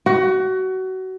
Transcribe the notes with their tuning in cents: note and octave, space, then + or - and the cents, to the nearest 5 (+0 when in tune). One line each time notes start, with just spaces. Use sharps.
F#4 +25